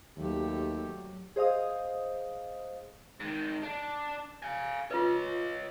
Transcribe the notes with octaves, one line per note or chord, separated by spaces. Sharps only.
D#2 F#3 A3 G4
G#4 C5 D#5 F5 D#6
G#2 D#3
D4
F5 G#5
F4 B4 C#5 D#5